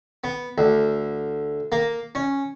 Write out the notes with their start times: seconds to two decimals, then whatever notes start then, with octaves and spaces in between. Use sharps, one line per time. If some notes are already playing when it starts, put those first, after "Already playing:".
0.24 B3
0.58 D2
1.72 A#3
2.15 C#4